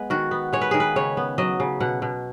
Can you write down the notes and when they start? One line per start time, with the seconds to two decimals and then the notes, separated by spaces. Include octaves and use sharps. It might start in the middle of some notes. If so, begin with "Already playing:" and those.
Already playing: G#3 B3 B4
0.10 D#3 F#4
0.31 B3
0.53 G#3 C#5
0.61 B4
0.71 D#3 G#4
0.80 B4
0.96 C#3 C#5
1.17 B3
1.38 F#3 D#5
1.60 C#3
1.80 B2 F#5
2.02 B2